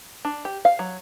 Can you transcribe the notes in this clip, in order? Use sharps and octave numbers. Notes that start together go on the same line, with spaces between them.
D4
G4
F5
F#3